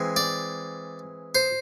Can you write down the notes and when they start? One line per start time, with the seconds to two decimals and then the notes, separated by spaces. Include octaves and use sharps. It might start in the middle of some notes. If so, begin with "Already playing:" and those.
Already playing: E3 G#3 C4
0.16 D5
1.35 C5